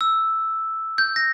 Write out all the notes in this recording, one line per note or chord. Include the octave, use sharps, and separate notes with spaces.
E6
G6
A#6